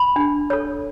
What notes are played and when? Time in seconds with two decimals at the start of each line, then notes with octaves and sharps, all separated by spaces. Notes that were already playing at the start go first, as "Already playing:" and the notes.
Already playing: B5
0.16 D4
0.50 A4 C#5